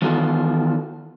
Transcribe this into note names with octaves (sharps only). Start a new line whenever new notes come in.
D#3 E3 B3 F4 F#4 A4